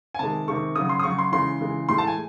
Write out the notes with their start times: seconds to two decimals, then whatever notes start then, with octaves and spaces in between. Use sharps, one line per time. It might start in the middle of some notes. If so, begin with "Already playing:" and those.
0.15 G#5
0.19 C3 D#3 G#3 A5
0.47 C3 D#3 G#3 C#6
0.76 C#3 F#3 D#6
0.89 C6
0.99 D#6
1.03 C#3 F#3 C#6
1.19 C6
1.32 C#3 E3 G#3 C6
1.60 C#3 E3 G#3
1.89 A2 E3 G#3 C6
1.98 A5
2.07 G#5